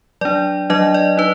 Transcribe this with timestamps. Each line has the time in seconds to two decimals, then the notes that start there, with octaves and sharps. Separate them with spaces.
0.21 F#3 D4 D5
0.70 F#3 D4 D#5
0.94 D5
1.17 D#4 B4